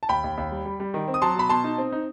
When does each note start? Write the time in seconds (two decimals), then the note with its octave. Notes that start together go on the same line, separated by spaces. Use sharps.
0.03 A5
0.09 D#2 G5 B5
0.24 D#2
0.38 D#2
0.51 G3
0.65 G3
0.80 G3
0.94 D#3
1.08 C4
1.14 D#6
1.22 F#3 A5 C6
1.36 B2 B5
1.49 B2 A5 C6
1.64 D#4
1.78 C4
1.92 D#4